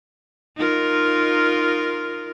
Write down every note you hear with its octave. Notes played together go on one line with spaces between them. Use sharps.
D#4 F4 A#4